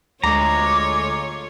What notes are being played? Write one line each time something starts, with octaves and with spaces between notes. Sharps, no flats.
D2 G#3 A3 F4 C#5 A#5 D6